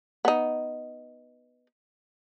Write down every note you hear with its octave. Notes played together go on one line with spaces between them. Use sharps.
B3 D#4